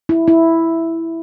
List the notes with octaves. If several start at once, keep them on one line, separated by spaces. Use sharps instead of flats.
E4
E4